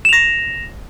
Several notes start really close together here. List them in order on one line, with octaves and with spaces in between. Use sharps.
E7 F7 A#6